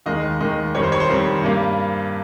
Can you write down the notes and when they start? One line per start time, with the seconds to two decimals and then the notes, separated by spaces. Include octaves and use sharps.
0.06 D#2 D#3 G#3 D#5
0.40 D#2 D#3 G#3 D#5
0.75 F2 D#3 G3 C4 C#5
0.83 C5
0.92 C#5
1.00 C5
1.09 F2 D#3 G3 C4
1.43 G2 G3 A#3